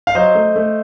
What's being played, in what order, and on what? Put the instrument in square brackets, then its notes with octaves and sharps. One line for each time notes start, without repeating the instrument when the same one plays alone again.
[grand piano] F5
F#3 C5 D#5
A3
A3